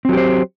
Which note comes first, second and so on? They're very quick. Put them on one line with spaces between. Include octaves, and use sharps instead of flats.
C4 F#3 G4 C5